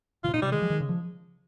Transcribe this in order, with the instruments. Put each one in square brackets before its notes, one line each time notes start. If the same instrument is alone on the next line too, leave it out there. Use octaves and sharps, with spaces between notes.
[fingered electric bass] C#3 [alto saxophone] F4
[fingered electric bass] C3
[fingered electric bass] A#2 [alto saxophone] D#4
[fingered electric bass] C3 [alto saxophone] G3
[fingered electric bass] D#3 [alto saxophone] G#3
[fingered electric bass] F3
D#3
C#3
F3